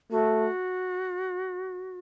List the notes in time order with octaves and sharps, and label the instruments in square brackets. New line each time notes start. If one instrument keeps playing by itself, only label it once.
[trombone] A3 [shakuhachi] F#4